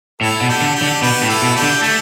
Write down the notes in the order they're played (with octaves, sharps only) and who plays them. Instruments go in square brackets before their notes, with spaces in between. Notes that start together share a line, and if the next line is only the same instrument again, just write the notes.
[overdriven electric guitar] A2 [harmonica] E4 A4
[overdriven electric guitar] B2
[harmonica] D4 G4
[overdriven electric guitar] D3
[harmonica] D4 G4
[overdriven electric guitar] D3
[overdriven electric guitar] B2 [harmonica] G4 B4
[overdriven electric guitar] A2
[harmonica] E4 A4
[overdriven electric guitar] B2
[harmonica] D4 G4
[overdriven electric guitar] D3
[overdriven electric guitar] A3 [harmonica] D4 G4